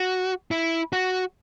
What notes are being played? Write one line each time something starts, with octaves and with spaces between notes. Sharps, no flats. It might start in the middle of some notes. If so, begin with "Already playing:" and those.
Already playing: F#4
E4
F#4